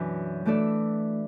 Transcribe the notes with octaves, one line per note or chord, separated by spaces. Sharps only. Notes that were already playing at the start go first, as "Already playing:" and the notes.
Already playing: F#2 B2 E3 D4 F#4
E3 A3 D4 A4 D5